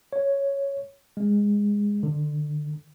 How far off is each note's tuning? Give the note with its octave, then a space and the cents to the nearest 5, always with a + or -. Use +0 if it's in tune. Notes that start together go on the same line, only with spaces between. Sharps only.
C#5 +0
G#3 -15
D3 +25